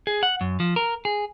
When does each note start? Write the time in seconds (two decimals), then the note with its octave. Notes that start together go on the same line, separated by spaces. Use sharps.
0.07 G#4
0.23 F#5
0.41 F#2
0.60 F3
0.76 A#4
1.05 G#4